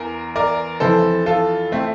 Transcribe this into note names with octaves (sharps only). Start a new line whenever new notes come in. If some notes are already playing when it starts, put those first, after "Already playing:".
Already playing: E2 A#4
A#4 D5
F2 E3 A4 C5
F4 A4
A3 C4